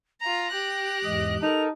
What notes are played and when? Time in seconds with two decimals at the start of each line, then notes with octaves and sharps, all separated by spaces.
0.21 F4 A#5 A#6
0.52 G4 G5 F#6
1.05 E2 G#2 D#5
1.43 D#4 A4 A#4 F7